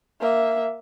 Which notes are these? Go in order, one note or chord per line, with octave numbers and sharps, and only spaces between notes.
A#3 E5